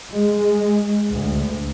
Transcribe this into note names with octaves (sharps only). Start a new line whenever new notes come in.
G#3
D2